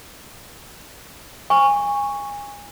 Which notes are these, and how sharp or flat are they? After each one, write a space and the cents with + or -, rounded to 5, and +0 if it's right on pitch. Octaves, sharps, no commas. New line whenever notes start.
G#5 -25 C#6 +0